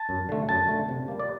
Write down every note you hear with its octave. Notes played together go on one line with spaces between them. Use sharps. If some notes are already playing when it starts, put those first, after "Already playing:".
Already playing: A5
F#2
D3 A3
F#2 A5
D3 A3
C3
G3 A#3
D5